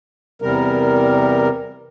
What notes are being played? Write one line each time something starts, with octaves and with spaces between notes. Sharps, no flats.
E2 C3 G3 A#4